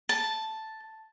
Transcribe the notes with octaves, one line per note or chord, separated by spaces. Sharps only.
A5